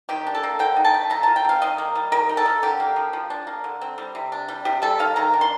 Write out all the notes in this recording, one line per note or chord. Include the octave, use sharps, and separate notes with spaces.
D#3 G4
D4
A4
A#3
D3 G5
D#4
A5
A3
F3 A#5
F4 A5
G5
C4 F5
D#3 D#5
A#3
G3
D#3 A#4
D#4
A4
A#3
D3 G4
A#3
F3
F3
D4
A#3
D3
C4
G3
C3
D4
G3
C3 G4
G3 A4
D#3 F5
D#3 A#5
D4
C6